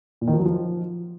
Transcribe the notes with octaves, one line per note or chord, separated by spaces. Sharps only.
A#2
D#3
F3
F#3
F3